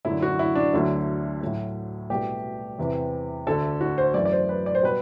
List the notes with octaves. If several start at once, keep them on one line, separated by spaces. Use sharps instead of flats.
F#2 D3 F#3 A3 E4
F#4
E4
D4
D2 D3 F#3 A3
A2 F#3 A3
C2 B2 A3 G4
E2 C3 E3
D2 D3 A3 A4
F#4
C5
F#2 E3 A3 D5
D5
C5
B4
D5
C5
B2 G3 B4